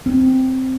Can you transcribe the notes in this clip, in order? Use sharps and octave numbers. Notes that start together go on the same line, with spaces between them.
C4